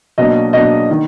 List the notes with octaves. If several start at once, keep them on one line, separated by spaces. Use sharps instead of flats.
B2 F#3 A#3 D4 D#5
B2 F#3 A#3 D4 D#5
D#3